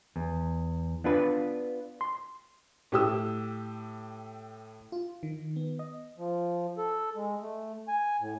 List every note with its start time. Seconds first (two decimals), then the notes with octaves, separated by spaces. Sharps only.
0.16 E2
1.04 B3 D4 F4 B4
2.01 C6
2.92 A2 G4 E6
4.92 F4
5.23 D#3
5.56 B3
5.79 D#5
6.18 F3
6.78 A4
7.16 G#3
7.41 A3
7.88 G#5
8.20 A2